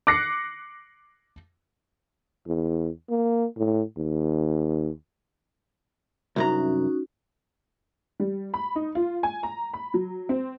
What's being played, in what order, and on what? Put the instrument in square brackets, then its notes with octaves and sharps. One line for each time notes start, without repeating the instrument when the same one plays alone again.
[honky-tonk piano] D6 F#6 A#6 C7 C#7
[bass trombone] E2
A#3
A2
D#2
[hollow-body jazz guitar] C2 F#2 A#5 [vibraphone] C#4 D#4 F#4
[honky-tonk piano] G3
B5
D#4
F4
G#5
A#5
B5
F#3
C4